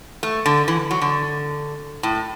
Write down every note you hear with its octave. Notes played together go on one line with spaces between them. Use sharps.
A3
D3
E3
F#3
D3
A2